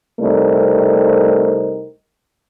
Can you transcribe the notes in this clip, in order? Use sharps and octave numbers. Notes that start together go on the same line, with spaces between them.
C2 A3 C4 D#4 A#4